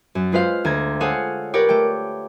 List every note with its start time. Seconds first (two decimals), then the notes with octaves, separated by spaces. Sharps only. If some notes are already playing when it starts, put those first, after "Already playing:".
0.15 F#2
0.32 G#3 F4 B4 C5 F5
0.64 D2 A#5 G#6
1.01 G#4 A4 C5 C#5 F5 F#5
1.54 G4 A#4 B4 C#5 D5 G5
1.69 A3 G5